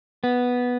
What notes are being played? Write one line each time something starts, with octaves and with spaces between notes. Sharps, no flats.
B3